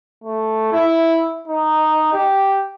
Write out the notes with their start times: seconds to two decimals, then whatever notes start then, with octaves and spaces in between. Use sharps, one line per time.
0.24 A3
0.72 E4
1.48 D#4
2.13 G4